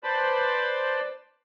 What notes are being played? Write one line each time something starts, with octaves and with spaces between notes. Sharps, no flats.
B4 C5 D5 A5 B5